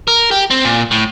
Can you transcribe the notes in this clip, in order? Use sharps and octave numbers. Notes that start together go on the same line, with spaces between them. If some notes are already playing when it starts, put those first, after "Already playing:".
A#4
G4
C4
A#2
A2